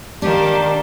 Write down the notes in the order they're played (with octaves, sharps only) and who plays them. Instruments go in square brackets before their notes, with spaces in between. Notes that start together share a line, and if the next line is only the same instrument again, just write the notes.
[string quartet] D#3 G3 A#3 [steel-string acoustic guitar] D4 [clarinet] G4